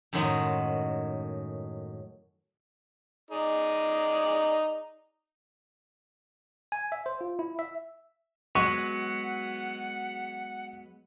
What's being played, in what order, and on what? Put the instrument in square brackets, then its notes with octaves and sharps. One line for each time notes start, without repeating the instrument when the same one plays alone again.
[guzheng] F#2 A2 D#3 F#3 G#3
[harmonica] D#4 G#4 D5
[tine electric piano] G#5
E5
C5
F4
E4
E5
[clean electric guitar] F#3 G#3 B3 [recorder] F#5 [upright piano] C#6